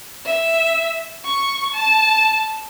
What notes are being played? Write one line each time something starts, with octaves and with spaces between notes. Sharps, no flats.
E5
C#6
A5